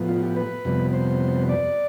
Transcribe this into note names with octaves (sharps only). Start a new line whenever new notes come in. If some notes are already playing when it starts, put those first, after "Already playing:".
Already playing: A2 F3 B3
F4
G4
B4
F2 C3 G3 B3
C5
D5